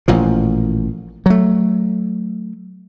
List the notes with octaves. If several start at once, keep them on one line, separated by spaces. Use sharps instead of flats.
A1 A#2 F3
F#3 A3